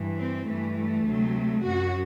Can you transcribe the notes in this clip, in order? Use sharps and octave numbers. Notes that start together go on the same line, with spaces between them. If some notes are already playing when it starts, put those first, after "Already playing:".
Already playing: G2 E3
C4
G2 E3 A3
A3
D2 C3 F#3
F#2 F#3 F#4